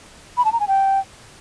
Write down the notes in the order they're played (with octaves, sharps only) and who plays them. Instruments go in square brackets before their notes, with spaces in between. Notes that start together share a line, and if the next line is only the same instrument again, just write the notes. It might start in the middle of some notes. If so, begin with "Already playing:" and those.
[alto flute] B5
A5
A#5
G#5
G5